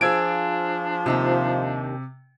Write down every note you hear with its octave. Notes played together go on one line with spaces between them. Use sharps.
F3 D4 F4 G#4 E6 G#6 D7
D#2 C3 D#4 G4